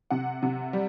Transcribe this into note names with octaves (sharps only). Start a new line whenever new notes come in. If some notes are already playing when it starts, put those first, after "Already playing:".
C3 F#5
C3
G3